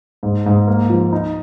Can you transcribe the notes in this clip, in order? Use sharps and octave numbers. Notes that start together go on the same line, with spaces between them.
G#2
G#2
A#3
F3
D#4